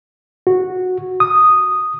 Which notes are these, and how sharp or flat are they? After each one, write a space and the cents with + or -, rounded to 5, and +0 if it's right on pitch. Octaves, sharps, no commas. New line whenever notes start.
F#4 -10
D#6 -5